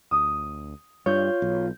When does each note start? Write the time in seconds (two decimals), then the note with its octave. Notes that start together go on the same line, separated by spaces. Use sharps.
0.11 D2 D#6
1.06 G2 F4 C#5 G6
1.42 B1